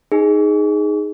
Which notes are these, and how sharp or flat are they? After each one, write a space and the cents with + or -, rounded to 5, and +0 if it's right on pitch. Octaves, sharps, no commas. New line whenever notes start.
D#4 +0 G#4 +0